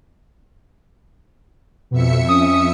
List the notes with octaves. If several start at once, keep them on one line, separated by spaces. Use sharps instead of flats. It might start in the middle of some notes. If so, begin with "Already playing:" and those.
F2 B2 E5 C#7
C#4 D#6